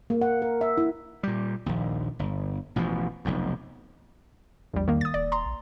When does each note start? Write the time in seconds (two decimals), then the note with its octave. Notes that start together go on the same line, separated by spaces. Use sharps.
0.10 A#3
0.21 F#5
0.42 A#4
0.61 E5
0.77 E4
1.23 A#2 G3
1.66 A#1 D#2
2.19 G1
2.76 A1 B2 E3 F3
3.25 F1 B1 F2
4.74 A#1 E2 G3
4.88 D#3 A#3
5.01 D#6 A6
5.14 D#1 D5
5.32 A#5 C6
5.45 A#1